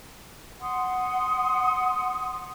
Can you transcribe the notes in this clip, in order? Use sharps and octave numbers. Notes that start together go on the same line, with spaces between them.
F#5 C6 D#6